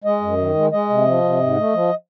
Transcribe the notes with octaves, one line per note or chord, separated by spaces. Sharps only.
G#3 D#5
F#2
D#3
G#3
G#3 D#5
C3
F3
C3
G#2
A3
F3